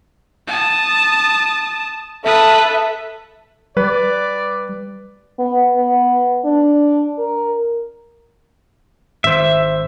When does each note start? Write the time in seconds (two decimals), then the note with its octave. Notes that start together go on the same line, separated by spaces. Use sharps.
0.47 A5 D#6
2.25 A4 B4 E5 D#6
3.77 G3 B4 D5
5.39 B3
5.76 B3
6.45 D4
7.18 A#4
9.24 G#1 C5 E5